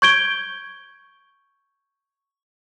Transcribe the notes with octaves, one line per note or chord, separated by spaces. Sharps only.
C#6 G6 G#6 D7 G7